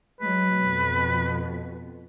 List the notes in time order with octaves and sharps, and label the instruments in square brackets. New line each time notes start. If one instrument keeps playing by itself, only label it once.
[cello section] F#3 G#3 [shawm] B4
[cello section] F2 B2